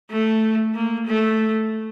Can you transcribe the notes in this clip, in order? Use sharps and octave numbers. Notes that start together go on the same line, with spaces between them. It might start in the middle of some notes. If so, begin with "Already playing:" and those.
A3
A#3
A3